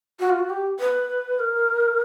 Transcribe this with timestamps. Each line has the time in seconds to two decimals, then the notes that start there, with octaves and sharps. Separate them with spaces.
0.20 F#4
0.29 F4
0.39 F#4
0.50 G4
0.80 B4
1.39 A#4